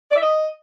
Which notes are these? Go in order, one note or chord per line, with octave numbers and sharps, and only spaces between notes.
D5
E5
D#5